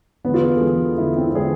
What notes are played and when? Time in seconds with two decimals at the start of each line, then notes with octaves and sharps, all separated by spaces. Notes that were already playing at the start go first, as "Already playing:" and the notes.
0.24 E2 D3 G#3 B3
0.34 F4
0.42 G#4
0.52 A4
0.61 E2 D3 G#3
0.98 E2 D3 G#3 E4
1.17 C4
1.26 E4
1.35 D3 G#3 G#4